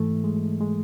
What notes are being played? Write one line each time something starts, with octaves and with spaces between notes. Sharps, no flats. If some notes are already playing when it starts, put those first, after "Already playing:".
Already playing: G#2 E3 A3
G#3
G#3